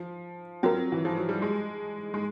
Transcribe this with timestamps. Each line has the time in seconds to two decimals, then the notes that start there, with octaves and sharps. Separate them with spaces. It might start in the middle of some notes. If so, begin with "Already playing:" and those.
Already playing: F3
0.63 F#3 C4 F4 A#4
0.92 E3
1.05 F3
1.17 F#3
1.29 G3
1.42 G#3
2.14 G#3